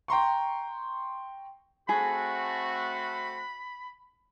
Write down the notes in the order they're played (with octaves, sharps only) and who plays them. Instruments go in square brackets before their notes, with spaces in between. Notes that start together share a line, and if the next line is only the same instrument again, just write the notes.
[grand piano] G5 A#5 C6 C#6
[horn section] A3 C4 F#4 [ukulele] G#4 [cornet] B5